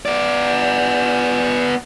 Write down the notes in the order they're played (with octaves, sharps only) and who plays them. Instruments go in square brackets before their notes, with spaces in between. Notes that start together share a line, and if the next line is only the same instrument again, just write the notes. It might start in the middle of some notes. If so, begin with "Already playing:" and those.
[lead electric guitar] B3 D5